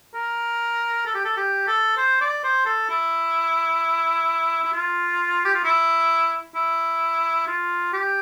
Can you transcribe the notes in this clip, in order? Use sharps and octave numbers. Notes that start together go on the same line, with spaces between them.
A#4
A4
G4
A4
G4
A4
C5
D5
C5
A4
E4
E4
F4
G4
F4
E4
E4
F4
G4